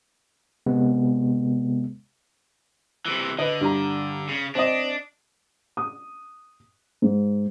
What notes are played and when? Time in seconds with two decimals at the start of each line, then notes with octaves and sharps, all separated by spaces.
0.66 C3 G#3 B3
3.06 C3 E3
3.39 D3 B4 D#5
3.61 G2 A#5
4.29 C#3
4.55 C4 D4 D#5
5.77 D#6
7.02 G#2